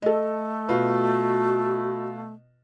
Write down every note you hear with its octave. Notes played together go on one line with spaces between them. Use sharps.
A3 A4 D#5
B2 F4 F#4 B4